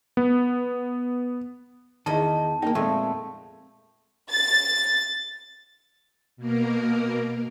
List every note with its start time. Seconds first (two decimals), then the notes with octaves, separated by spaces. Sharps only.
0.17 B3
2.06 E2 D#3 E4 D#5 A5
2.62 A#3 C4 D#4 G5
2.75 F2 A#2 G#3 A3
4.31 A6
6.37 B2 A#3 A#4